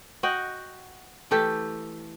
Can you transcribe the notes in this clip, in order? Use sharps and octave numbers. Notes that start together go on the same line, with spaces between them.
F#4 D#5 F#5 G5
E3 A3 G4 A4